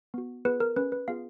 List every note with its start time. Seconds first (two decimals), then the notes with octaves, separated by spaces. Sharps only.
0.14 B3 F#4
0.45 B3 F4 G#4 B4
0.60 A#4
0.76 C#4 G#4 B4
0.92 B4
1.08 B3 F4 G#4 F5